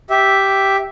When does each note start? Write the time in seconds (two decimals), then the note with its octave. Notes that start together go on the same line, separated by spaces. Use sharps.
0.10 G4 E5